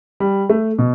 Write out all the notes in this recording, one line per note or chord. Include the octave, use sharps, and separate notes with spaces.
G3
A3
B2